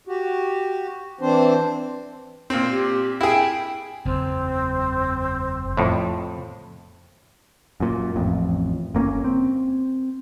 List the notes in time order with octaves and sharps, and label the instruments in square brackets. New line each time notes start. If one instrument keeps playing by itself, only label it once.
[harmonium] F#4 G4
E3 C4 D4 C5
[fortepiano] A#2 C4
[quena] G4
[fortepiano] E4 G#4 [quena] G5
[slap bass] F#1 E2 [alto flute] C4
[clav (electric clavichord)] F2 A2
[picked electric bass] F#2 A#2
A1 F2
G1 A#3 C4 C#4
C4